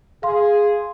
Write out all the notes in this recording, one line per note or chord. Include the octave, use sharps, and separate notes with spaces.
G#4 F5 C6